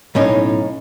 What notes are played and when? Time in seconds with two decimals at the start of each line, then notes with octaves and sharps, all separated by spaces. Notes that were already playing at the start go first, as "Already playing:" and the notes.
0.15 B1 A2 C#4 D#4